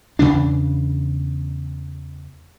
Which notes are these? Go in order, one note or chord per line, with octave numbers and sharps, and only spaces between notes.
E2 C#3 E3 D4